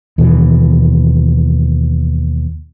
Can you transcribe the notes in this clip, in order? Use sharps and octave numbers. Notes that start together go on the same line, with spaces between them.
D#2 B2 E3